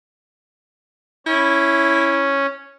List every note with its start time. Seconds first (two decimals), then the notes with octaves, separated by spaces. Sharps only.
1.26 C#4 E4